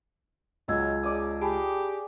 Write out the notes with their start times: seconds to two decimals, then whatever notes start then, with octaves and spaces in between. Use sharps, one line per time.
0.68 C#2 F#3 D#5 E6 G#6
1.03 C#3 D5 A5 D#6
1.41 G4 G#4 A5 B5